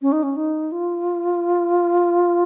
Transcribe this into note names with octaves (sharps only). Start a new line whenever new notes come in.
C#4
D#4
C#4
D#4
F4